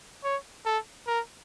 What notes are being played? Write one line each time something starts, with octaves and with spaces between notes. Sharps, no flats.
C#5
A4
A#4